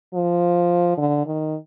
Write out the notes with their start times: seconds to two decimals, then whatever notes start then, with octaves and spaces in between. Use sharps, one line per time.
0.14 F3
0.97 D3
1.26 D#3